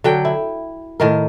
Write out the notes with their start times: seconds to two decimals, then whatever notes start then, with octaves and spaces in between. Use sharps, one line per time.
0.04 D3 F#3 G5
0.25 E4
1.00 A2 D#3 A#4